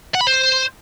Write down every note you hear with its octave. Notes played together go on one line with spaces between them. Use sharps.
F#5
B5
C5